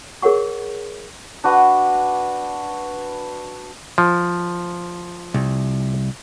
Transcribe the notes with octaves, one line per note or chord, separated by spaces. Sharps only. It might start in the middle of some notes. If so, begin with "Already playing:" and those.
G#4 A#4 C#5 F#5 C#6
D4 F#4 B4
F3
C2